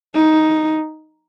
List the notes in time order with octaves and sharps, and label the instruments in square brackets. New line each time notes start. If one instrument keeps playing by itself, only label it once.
[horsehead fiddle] D#4